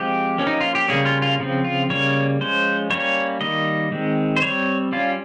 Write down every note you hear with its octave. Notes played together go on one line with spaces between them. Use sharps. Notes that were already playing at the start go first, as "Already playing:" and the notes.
Already playing: F3 G#3 C4 G4
F3 A#3 C#4
D#4
F4
G4
C#3 G3 A#3 C#4 G#4
F4
F4
C#3 F3 C4
F4
C#3 G3 A#3 C#4 C#5
F3 G#3 C#4 C5
G3 A#3 C#4 C#5
D#3 G3 A#3 D#5
D#3 G#3 C4
C5
G3 C4 C#5
G3 C#4 F4